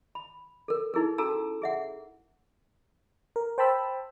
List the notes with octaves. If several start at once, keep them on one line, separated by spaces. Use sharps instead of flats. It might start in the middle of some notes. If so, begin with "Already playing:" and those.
B5
A4 A#4
D#4 E4 G#4 A#4
C#4 F#4 A4 A5 A#5 E6
G#4 E5 F#5
A#4
C5 G5 A5 B5 E6